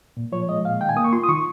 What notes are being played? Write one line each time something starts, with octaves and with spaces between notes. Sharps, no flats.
A#2
F3 C#5
G#3 D#5
A#2 F5
D#3 G5
G#5
A#3 D#6
C#6
F4 C6
D#6
D#3 C#6